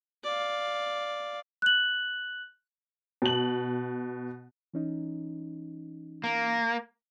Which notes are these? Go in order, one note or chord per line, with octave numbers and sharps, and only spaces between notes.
D5 F5
F#6 F#7
B2 F#7
E3 C#4 D#4
A#3